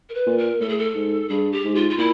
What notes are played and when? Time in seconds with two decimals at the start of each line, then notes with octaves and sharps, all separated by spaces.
0.09 A#4
0.14 B4
0.27 A#2
0.38 A#4
0.60 A2 A4
0.69 G#4
0.79 A4
0.95 G#2
1.29 G2 G#4
1.52 G4
1.64 G#2
1.75 F4
1.90 F4
1.98 A#2 E4